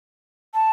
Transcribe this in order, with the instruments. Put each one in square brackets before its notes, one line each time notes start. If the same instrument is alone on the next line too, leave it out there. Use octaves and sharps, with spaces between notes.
[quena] A5